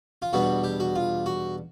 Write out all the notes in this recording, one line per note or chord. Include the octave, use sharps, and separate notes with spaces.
F4
E2 B2 G3 B3 D4 F#4
G4
F#4
F4
F#4